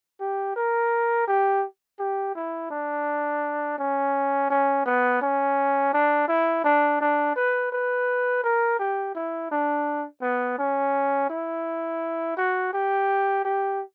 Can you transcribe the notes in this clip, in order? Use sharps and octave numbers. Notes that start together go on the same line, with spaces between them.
G4
A#4
G4
G4
E4
D4
C#4
C#4
B3
C#4
D4
E4
D4
D4
B4
B4
A#4
G4
E4
D4
B3
C#4
E4
F#4
G4
G4